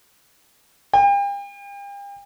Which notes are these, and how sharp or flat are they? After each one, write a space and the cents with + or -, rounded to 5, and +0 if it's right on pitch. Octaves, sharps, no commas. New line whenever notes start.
G5 +40